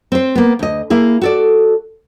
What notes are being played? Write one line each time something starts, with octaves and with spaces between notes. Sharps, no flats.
C4 C5
A#3 B3
D2 D#5
A#3 E4 G#4
F#4 A4 D5